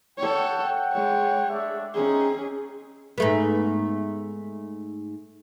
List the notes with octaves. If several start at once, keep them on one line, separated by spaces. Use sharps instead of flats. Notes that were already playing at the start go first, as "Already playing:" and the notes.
A4 C#5 F#5 G5
G#3 C#5
A3 D4 E5
G#3 C4 C#4 D#4 G#4
G#2 A3 B3